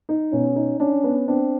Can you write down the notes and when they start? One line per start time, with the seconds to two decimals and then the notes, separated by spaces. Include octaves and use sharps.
0.09 D#4
0.33 B2 C#4
0.56 D#4
0.80 C#4 D4
1.04 B3
1.27 C4 D4